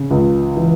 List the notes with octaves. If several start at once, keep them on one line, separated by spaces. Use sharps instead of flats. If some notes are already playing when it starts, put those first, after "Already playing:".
Already playing: C#3
C#2
E3